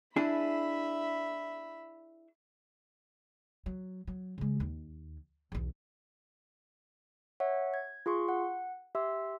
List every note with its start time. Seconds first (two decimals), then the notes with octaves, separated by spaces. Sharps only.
0.16 D4 E4 G#4 E5 B5
3.66 F#3
4.07 F#3
4.38 C#3 G#3
4.60 D#2
5.52 B1 E2
7.40 C#5 E5 F#5
7.74 G#6
8.06 F4 G#4 C6 C#6
8.29 F#5
8.95 G4 E5 C6 E6